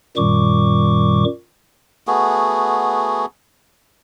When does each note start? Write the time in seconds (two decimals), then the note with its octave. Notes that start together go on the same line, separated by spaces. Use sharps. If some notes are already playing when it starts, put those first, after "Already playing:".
0.17 F#2 A#2 D#3 G3 C#6 D6
2.07 A3 B3 F#4 G#4